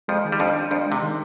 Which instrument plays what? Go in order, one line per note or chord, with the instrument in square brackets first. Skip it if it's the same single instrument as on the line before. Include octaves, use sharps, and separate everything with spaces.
[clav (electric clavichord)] F2 F3 [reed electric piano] G#3
[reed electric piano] D#3
[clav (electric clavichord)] G3
[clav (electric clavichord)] F2 F3 [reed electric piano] D4
[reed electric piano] D4
[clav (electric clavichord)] F2 F3 [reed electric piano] D4
[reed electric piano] G#3
[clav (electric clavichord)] C3
[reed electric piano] D#3